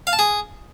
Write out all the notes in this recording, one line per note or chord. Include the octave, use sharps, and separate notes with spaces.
F5
A5
G#4